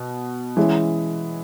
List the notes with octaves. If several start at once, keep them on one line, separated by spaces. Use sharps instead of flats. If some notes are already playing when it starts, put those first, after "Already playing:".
Already playing: B2
E3 G#3 C#4